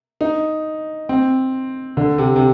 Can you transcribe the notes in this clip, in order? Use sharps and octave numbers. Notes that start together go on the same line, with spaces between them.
D#4
C4
D3
C3
C3